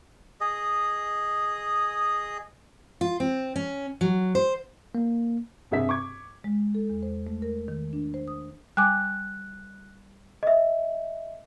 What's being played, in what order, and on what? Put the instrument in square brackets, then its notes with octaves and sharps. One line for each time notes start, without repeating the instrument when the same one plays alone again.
[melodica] G#4 D#5
[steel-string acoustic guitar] F4
C4
C#4
F#3
C5
[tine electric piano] A#3
[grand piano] G2 C3 G#4 E5 B6
C#6 D6 G#6
[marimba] G#3
A4
E2
C5
A3
A#4
D#3
D4
C5
D#6
[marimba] G3 G#5 D6 [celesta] F#6
[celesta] D#5 E5